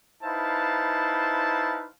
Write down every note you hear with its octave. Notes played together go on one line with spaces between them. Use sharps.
D#4 E4 B4 C5 F5 A5